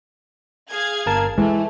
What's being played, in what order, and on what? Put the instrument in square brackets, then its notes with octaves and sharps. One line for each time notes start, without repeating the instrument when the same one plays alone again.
[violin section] G#4 F5 G#6
[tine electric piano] G1 A#4 A5
[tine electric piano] E3 [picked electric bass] G#3 [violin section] A3